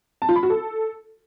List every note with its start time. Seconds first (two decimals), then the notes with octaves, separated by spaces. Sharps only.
0.22 A5
0.29 F4
0.36 B5
0.43 F#4
0.50 A4